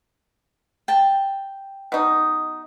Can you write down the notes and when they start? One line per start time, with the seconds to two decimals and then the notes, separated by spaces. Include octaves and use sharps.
0.88 G5 A5
1.92 B2 D#4